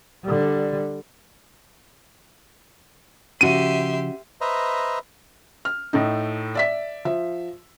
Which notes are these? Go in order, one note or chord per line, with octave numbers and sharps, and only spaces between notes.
D3 G3
C#3 F3 C#4 F#4 G4 E5 C6 D#7
B4 C5 D#5 E5 A#5
F6
A2 A3 D#4
D5 E5 B6
F3 E5